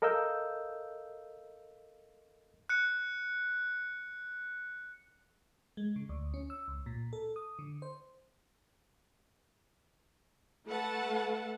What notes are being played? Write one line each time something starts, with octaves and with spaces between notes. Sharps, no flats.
A4 A#4 D#5 F5 E6 G6
F#6 C#7
G#3
C#3
D2
C#4
E6
C#2
A#2
A4
D#6
D3
C5
A3 A4 B4 F#5 A5